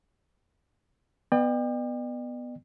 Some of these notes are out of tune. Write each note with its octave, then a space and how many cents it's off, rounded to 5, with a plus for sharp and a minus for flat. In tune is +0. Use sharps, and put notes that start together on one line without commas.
B3 +0 D5 +45 G5 +30